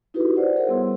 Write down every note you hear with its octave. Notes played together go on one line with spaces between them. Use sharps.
D#4 E4 F#4 G4 A4 B4
C5 D5 F#5
G#4 A#4 C5 C#5 E5 F#5
G3 B3 E4 C6 E6